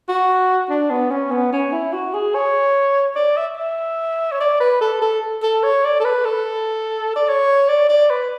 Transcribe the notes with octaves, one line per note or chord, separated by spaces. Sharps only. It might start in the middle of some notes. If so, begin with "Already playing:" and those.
F#4
D4
B3
C#4
B3
C#4
E4
F#4
G#4
C#5
D5
E5
E5
C#5
D5
B4
A4
A4
A4
C#5
D5
A4
B4
A4
D5
C#5
D5
D5
B4